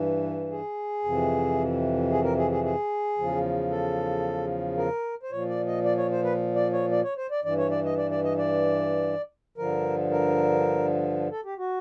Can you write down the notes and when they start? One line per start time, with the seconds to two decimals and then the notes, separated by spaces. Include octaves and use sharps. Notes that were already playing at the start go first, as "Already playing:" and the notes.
Already playing: G2 E3
0.51 G#4
1.04 F2 C3 E3
2.11 G#4
2.24 A#4
2.38 G#4
2.51 G#4
2.64 G#4
3.18 E2 C#3 F3
3.71 A4
4.77 A#4
5.23 C5
5.31 A#2 F3 C#5
5.49 D5
5.67 D#5
5.84 D5
5.98 C#5
6.11 C5
6.24 B4
6.55 D5
6.73 C#5
6.91 D5
7.04 C#5
7.17 C5
7.31 D5
7.44 G2 E3 D5
7.58 C#5
7.71 D5
7.85 D#5
7.97 D5
8.11 D5
8.24 D#5
8.38 D5
9.58 G2 D3 F3 A#4
10.11 A#4
11.31 A4
11.45 G4
11.58 F#4